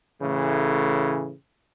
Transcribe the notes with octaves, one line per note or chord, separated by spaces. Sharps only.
A2 C#3 E3 A3